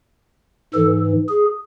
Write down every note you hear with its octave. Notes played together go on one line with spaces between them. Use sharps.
G#2 E3 A4
G#4